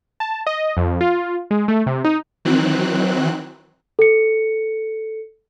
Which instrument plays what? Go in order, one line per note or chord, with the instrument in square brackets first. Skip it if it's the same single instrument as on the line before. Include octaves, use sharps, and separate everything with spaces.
[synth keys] A5
D#5
F2
F4
G#3
A3
C3
D#4
[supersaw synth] D#3 E3 F#3 C4 F#6
[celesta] A4 C#7